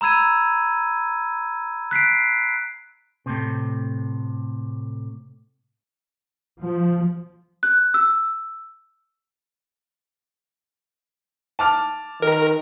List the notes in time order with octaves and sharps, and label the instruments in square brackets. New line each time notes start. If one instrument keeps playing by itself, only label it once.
[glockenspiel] A#5 B5 E6 G#6 D#7
F#6 B6 C7 D7
[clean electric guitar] A2 C3
[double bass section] F3
[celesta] F#6
E6
[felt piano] A5 D6 F6
[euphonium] D#3 [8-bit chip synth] A#4